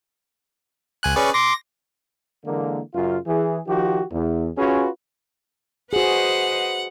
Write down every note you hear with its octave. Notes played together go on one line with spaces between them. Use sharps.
C#2 G#5 F#6
C#4 G#4 B4 D5 C#6
C6 D6 A#6
D3 E3 G#3 A#3
F#2 C#3 F4
E3 G#4
D#3 F3 F#4 G4
E2
C#4 F4 F#4 G#4 B4
F#4 G#4 B4 C5 D#5 F#5